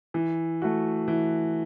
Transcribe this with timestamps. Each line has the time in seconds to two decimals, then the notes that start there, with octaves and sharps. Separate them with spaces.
0.14 E3
0.62 A3 F#4
1.08 E3